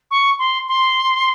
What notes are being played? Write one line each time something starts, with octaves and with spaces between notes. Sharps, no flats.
C#6
C6
C6